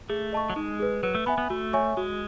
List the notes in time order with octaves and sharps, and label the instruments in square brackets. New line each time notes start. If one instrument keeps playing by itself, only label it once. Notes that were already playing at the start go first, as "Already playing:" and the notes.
[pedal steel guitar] A3 [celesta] G#4
[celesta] D#5 A5 C#6
[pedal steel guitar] F#3
[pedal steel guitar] G#3 [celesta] D#4
[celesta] G#4 B4
[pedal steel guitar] F#3 [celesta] B4
[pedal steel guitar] A3
[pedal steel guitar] B3 [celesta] E5 G#5 B5
[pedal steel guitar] B3
[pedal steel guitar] A3 [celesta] F#4
[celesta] C#5 E5 G#5 C#6
[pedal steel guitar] G#3 [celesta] F#4